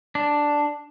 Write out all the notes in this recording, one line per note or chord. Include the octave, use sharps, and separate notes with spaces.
D4